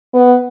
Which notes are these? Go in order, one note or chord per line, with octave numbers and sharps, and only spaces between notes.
B3